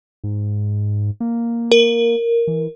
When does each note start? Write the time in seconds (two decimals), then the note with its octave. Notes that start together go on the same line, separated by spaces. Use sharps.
0.24 G#2
1.20 A#3
1.72 A#4
2.47 E3